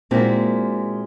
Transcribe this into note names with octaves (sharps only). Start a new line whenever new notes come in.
A#2 G#3 A#3 C4 E4 F#4